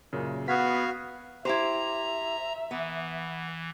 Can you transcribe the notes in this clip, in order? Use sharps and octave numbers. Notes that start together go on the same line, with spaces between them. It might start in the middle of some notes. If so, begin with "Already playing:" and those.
F#2 A#2 C#3
B3 F#4 F5 D#6 G#6 B6
E4 G4 C5 E5 A#5
E3 B3